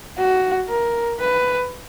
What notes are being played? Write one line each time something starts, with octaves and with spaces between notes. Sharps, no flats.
F#4
A#4
B4